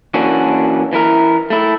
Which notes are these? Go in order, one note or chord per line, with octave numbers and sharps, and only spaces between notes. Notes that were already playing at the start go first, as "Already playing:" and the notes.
E3 A#3 C#4 D4 F#4
E3 E4 A#4
A3 E4